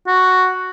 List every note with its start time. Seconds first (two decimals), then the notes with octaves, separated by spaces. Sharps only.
0.07 F#4